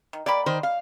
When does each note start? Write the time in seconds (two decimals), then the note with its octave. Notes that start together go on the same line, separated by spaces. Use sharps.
0.13 D#3
0.26 A#3 G4 D5 B5
0.46 D#3 C5
0.63 F5